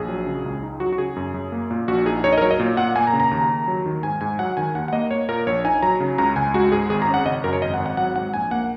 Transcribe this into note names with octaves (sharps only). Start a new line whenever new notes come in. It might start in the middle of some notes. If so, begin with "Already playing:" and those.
Already playing: A#1 G#4
F#3
C#3
C#2
D#4
F#3 F#4
F#4
C#3 G#4
F#2
F#2
A#3
A#2
A#1 F#4
D#4 G#4
D#4 C#5
D#5
A#4
F#3 C#5
D#5
A#2
A#2 F#5
A#3 G#5
A#5
C#3
A#5
D#2
D#2
F#3
D#3
G#2 G#5
G#2 G#5
F#3 F#5
D#3 G#5
D#2 F#5
F#5
A#3 D#5
A#3 C#5
A#2 A#4
A#1 C#5
D#4 G#5
F#3 A#5
C#3
C#2 A#5
C#2 G#5
G#3 F#4
G#2 G#4
G#1 G#4
A#5
C#4
F#5
C#3 D#5
F#2 A#4
C#5
G#1 D#5
F#5
G#1
F#5
F#3 F#5
G#2 F#5
A#1 G#5
A#3 F#5